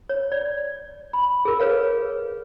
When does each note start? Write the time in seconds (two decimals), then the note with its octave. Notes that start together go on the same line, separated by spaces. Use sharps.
0.09 C#5
0.32 D5
1.13 B5
1.45 G#4 A#4
1.60 G#4 A4 B4 C#5 F5